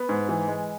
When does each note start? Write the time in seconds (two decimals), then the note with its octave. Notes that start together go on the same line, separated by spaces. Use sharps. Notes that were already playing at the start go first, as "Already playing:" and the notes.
Already playing: B3
0.09 G#2
0.29 E3
0.48 G#3